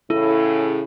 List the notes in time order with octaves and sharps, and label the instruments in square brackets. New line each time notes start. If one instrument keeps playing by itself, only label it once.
[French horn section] A2 C#3 [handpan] E4 [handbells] A4